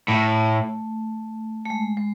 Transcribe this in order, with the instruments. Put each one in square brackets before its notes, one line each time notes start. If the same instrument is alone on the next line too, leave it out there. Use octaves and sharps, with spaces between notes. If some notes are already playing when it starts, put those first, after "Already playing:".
[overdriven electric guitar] A2 [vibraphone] A3
[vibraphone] A3
G#3
G#3